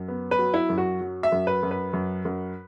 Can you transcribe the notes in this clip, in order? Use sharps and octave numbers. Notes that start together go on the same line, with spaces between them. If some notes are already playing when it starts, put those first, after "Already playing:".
Already playing: F#2
B3
B4
F#3
E4
F#2
F#4
F#3
E5
F#2
B4
F#2
B4
F#2
F#2